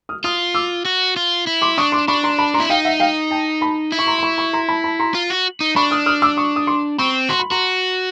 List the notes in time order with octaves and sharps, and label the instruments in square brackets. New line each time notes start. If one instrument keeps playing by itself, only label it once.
[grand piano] D#6 F6
[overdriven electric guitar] F4 [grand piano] D#6 F6
[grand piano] D6 E6
[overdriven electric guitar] F#4
F4
E4
[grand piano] C6 D6
[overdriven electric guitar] D4 [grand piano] C#6 D#6
[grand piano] C6 D6
[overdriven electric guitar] D4 [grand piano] B5 C#6
[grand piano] A#5 C6
A5 B5
A#5 C6
[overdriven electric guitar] E4
[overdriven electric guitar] D#4 [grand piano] F5 G5
[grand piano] E5 F#5
F5 G5
G5 A5
A5 B5
[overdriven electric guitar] E4
[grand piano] C#6
A#5 C6
C6
B5 C#6
B5 C#6
A#5 C6
A5 B5
A5 B5
A#5 C6
[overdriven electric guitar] F4
F#4
D#4
[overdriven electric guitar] D4 [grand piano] B5 C#6
[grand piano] D#6 F6
D#6 F6
D6 E6
C#6 D#6
D#6
C6 D6
[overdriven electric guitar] C4 [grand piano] B5 C#6
[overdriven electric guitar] F#4 [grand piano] C6
[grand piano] B5
[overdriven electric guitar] F#4 [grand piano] A#5 C6